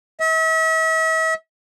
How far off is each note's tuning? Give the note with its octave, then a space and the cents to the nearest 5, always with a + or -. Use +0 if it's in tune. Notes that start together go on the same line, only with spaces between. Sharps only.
E5 -40